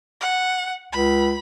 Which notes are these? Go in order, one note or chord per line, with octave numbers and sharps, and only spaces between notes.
F#5
C#2 B5